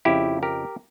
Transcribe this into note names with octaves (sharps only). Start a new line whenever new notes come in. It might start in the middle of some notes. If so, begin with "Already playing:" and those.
F2 C#3 F3 E4 G4
G4 A#4